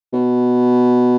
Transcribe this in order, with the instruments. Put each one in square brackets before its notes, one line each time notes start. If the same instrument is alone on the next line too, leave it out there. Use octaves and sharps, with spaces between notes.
[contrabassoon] B2